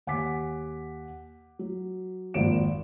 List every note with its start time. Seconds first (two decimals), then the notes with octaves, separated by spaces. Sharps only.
0.07 D#2 F#5 G#5 D6 B6
1.59 F#3
2.34 G#1 F2 A#3 D5 D7 E7